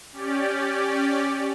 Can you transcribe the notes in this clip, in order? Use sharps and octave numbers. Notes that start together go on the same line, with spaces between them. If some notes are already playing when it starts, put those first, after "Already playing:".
C#4 G4 D5